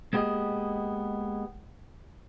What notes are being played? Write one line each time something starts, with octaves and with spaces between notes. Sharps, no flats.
G#3 A#3 B3 G4 G#4 D#5